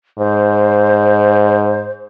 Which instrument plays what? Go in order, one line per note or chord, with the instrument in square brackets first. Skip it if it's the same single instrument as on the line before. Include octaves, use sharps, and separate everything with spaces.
[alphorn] G#2 [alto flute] C5